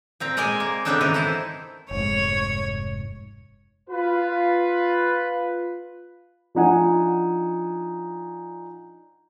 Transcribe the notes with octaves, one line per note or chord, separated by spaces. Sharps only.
A#2 C4 A#5
G#3 A#4 D5 D#5 G#5
A#3
C#3 B3 C4 D4 D#4 A4
D#3 E3 D#4
E4 A4 C5
F1 G#2 C#5
F4 B4
F3 D4 D#4 F#5 G#5